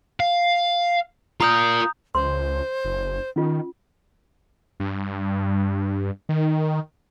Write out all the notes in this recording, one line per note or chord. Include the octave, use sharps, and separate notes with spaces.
F5
F4 A#4 A#5 D#6 G6
C#2 C5 C6
F#1
D#3 C#4 F4
G2
D#3